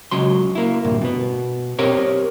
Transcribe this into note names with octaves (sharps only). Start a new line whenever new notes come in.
C#2 C#3 F#3 C6
A#3 E4
D2 G2 A#2
B2 B3
C4 G4 A#4 C#5